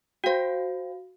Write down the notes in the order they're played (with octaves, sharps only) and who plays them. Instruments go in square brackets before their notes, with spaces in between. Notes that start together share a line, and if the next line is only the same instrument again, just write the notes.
[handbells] F#4 F5 [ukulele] C5 G5